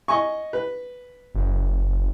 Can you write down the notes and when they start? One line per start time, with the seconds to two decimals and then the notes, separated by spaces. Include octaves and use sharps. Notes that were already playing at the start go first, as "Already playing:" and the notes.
0.08 D#5 G#5 C#6
0.53 B4
1.35 F#1